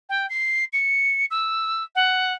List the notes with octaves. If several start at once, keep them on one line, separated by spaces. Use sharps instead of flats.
G5
C7
C#7
E6
F#5